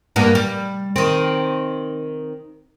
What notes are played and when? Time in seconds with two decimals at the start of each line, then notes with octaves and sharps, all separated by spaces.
0.16 G2 A#3 B3
0.35 G3
0.96 D#3 C4